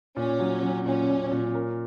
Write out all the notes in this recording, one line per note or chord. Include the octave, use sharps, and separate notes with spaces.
A#2 C#4
F#3
F#3
A#2 C#4
A#2
A#2
A#4